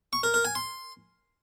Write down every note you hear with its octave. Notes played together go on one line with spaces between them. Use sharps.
C#6
A#4
A#4
G#5
C6